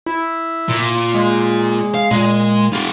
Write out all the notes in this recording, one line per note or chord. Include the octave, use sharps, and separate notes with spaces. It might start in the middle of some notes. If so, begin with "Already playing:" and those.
E4
A#2
G#3
F5
A#2 G#3
F4 G4